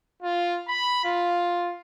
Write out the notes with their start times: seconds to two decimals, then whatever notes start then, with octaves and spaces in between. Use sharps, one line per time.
0.23 F4
0.68 B5
1.04 F4